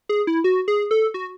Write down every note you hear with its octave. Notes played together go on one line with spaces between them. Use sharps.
G#4
E4
F#4
G#4
A4
F#4